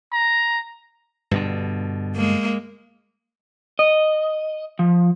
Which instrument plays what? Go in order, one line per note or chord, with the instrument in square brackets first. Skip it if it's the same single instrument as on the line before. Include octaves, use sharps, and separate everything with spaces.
[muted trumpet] A#5
[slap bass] G2 B2 D3
[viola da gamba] G#3 A#3
[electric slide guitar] D#5
F3